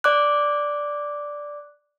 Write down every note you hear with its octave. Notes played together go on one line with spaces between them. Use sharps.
D5 D6 F#6